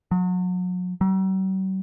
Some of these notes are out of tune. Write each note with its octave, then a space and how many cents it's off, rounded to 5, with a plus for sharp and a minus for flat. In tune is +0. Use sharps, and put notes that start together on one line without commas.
F#3 -35
F#3 +45